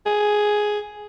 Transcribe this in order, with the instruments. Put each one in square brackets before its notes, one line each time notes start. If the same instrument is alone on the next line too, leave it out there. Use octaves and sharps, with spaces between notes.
[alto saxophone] G#4